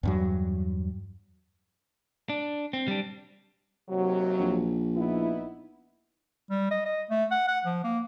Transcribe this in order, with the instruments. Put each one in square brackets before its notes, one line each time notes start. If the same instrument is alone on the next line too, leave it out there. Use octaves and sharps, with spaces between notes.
[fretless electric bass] E2 G2 F#3
[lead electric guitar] D4
C4
G3 D4
[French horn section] D#2 C3 F#3
[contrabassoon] A#1
[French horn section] B3 D#4 E4
[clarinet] G3
D#5
D#5
A3
F#5
F#5
F3
A#3